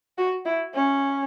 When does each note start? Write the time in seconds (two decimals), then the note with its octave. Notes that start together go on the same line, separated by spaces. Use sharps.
0.18 F#4
0.45 E4
0.74 C#4